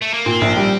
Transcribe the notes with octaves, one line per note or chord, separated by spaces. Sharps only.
A3
A#3
A#2 C4
A#1
G3